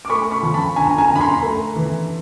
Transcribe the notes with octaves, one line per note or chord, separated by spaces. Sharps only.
D6
A3 B5 C#6
B5 C#6
F3
A5 B5
D3 G#5 A#5
G#5 A#5
D3
B5
A#5 C6
A3
E3